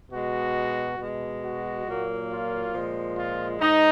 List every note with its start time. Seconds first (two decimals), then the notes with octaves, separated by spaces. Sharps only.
0.11 B2 G#3 F#4
0.99 B2 G#3
1.43 F#4
1.86 A#2 F#3 A#3
2.31 F4
2.74 A#2 F3 G#3
3.17 F4
3.61 G#2 D#4